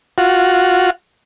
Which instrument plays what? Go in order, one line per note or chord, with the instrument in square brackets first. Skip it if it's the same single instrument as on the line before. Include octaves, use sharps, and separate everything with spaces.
[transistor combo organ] F4 F#4